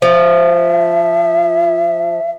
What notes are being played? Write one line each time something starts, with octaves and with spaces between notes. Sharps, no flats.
F3 E5